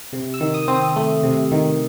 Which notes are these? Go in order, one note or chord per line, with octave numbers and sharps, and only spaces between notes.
C3
E6
D#3
D#6
C4
D#6
A3
C3
D#3